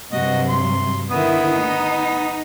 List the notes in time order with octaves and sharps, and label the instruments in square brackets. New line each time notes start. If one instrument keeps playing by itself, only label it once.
[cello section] G2 C3 F#3 [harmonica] F#4 D#5
[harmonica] C6
[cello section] D3 D#3 E4 [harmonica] B3 D#6
[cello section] D#4